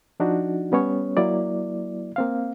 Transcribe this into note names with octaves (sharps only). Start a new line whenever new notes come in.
F3 D4 D#4 F#4
G3 B3 C#4 C#5
F#3 A#3 E4 D5
A#3 C4 F5